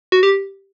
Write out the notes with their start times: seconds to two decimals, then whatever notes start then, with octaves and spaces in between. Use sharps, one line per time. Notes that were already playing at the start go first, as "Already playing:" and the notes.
0.12 F#4
0.23 G4